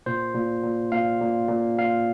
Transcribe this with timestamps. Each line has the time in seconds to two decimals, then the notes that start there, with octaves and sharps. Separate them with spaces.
0.06 A#2 C5
0.34 A#2
0.64 A#2
0.92 A#2 F5
1.21 A#2
1.49 A#2
1.79 A#2 F5